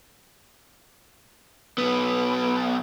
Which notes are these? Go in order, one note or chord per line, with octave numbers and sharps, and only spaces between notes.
B1 B3